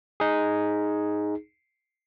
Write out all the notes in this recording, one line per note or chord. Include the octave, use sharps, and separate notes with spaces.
D#4 G#4